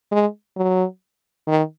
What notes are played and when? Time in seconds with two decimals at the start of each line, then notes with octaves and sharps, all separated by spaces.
0.12 G#3
0.57 F#3
1.48 D#3